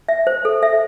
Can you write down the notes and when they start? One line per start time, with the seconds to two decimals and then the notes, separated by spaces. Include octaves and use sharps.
0.08 E5
0.27 C5
0.45 A4
0.63 E5